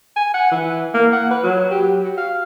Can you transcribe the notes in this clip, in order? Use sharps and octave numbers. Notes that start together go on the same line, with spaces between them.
G#5
F#5
E3
A#3
F#5
B4
F#3
G4
F#4
F5